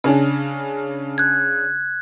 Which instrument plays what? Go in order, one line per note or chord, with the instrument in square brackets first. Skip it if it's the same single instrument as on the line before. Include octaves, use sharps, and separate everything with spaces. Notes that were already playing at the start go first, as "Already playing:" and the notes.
[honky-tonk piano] C#3 C#4 D4
[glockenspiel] F#6 G#6